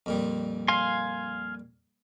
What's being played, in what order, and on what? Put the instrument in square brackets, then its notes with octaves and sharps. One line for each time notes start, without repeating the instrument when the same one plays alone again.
[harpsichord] F2 A#2 G3
[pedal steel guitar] F5 G#5 C6